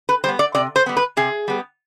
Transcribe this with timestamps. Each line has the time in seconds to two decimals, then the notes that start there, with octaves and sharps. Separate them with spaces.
0.09 B4
0.24 G3 B3 C5
0.39 D5
0.55 C3 D5
0.76 C5
0.86 G3 B3
0.97 B4
1.17 C3 G#4
1.48 G3 B3